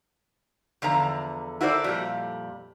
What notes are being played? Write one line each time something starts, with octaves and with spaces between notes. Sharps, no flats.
E2 D3 F3 A#5
E4 F#4 A4 A#4 C5 D5
F2 A#2 G3